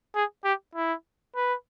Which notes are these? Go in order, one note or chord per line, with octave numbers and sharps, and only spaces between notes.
G#4
G4
E4
B4